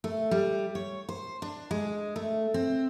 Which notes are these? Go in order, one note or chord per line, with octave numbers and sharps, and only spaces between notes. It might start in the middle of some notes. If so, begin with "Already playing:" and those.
A3
G3
C#5
C5
D4
G#3
A3
C4